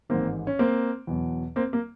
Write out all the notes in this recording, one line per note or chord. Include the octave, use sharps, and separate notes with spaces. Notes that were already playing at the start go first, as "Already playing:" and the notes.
A1 G#2 D#3 A#3 C4
C#4
A#3 C4
E2 B2 F#3
A#3 C4
A#3